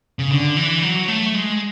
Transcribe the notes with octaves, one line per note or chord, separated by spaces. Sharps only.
C#3
D3
E3
F#3
A3
G#3